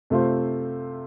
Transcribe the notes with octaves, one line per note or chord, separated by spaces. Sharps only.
C3 A3 F4 C5